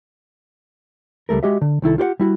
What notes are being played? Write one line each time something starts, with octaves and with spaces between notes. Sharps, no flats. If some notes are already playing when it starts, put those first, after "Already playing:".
C#2 G3 A3 A#4
G#3 F#4 G4 D#5 E5
D3
C2 D#3 E4 A4
F4 G4 C5 F#5
G3 E4 F#4